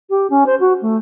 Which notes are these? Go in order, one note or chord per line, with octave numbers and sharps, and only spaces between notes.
G4
C#4
C5
F#4
A3